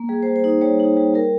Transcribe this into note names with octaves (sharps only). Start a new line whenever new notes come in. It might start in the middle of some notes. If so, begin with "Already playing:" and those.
Already playing: A#3
G3 G#4
C5
G3
C5
D#4
G3 C#5
D#4
G3
G3 A#4